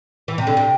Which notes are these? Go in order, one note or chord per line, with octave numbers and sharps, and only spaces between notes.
E3
C3
D3
C3